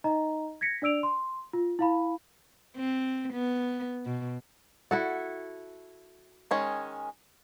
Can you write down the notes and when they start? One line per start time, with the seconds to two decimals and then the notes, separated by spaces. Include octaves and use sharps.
0.04 D#4 D#5 A#5
0.61 G#6 A#6 B6 C#7
0.82 D4 D5 E6 D7 F7
1.03 C6
1.53 F4
1.79 E4 F5 B5
2.77 C4
3.33 B3
4.06 B2
4.91 E4 F#4 A4 F#5
6.51 D#3 G#3 C#4